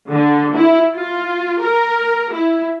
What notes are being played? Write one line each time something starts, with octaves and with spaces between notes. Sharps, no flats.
D3
E4
F4
A#4
E4